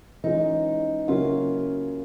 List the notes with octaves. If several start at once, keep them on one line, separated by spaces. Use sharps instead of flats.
E3 G#3 C#4 D#4 F4
C#3 F#3 A#3 C#4 E4 F4